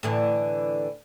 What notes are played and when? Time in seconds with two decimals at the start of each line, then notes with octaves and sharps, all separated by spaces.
0.03 A2 D3 E3